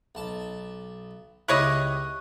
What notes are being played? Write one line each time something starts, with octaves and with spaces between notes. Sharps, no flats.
B1 A5
C#2 E4 G4 C#5 D#5 C#6 F#6